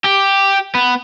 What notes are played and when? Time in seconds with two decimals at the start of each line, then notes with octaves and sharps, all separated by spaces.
0.04 G4
0.75 B3